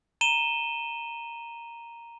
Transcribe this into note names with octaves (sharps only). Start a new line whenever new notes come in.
A#5 D#7 E7 G7